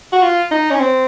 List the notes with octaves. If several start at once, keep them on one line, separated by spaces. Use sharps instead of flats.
F#4
F4
D#4
C#4
C4